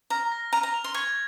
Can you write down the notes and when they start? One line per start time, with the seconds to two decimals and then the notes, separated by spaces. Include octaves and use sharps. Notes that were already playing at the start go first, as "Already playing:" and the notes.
0.10 A#5 F6
0.32 A#6
0.53 A#5 F6
0.63 A#5
0.74 F7
0.84 C6
0.94 C#6 G#6